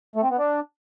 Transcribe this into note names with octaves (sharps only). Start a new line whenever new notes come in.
A3
C4
B3
D4